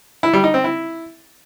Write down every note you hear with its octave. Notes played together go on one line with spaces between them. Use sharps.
E4
G3
D#4
C4
E4